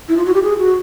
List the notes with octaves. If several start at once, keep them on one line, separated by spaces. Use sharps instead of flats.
E4
F4
F#4
G4
G#4
F#4